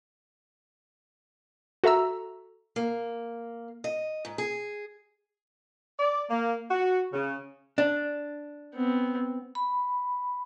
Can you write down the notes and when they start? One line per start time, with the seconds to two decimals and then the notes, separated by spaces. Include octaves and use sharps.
1.84 F#4 A4 E5 A#5 E6
2.76 A#3
3.84 D#5
4.25 G#2
4.38 G#4
5.99 D5
6.31 A#3
6.71 F#4
7.13 C#3
7.78 D4
8.75 B3 C4
9.55 B5